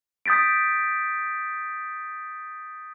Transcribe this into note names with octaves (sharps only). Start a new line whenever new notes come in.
D#6 G6 A6 B6 D7